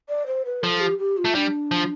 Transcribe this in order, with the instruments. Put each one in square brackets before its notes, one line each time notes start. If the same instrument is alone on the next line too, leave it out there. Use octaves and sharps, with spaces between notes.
[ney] D5
C5
B4
[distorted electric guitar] F3 [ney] A4
[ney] G4
G4
F4
[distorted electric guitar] A3
[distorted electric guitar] G3 [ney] D4
[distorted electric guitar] F3